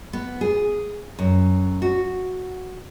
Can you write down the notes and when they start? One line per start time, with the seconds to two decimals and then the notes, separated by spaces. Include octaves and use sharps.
0.13 B3
0.41 G#4
1.19 F#2
1.82 F#4